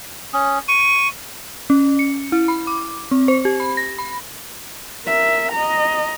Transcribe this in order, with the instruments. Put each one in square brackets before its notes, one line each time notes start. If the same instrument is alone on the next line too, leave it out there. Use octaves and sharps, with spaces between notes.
[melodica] C#4 [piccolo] D#6
[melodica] C#6 [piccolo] D#7
[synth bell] C#4
C#7
E4
B5
D6
C4
C5
G4
B5
A#6
B5
[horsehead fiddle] A#4 E5
D#5 A#5